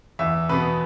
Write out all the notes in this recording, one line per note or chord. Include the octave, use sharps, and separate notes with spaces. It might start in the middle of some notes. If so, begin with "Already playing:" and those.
E2 E5
B2 B3 B4